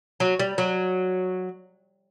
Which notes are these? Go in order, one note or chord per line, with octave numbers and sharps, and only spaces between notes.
F#3
G3
F#3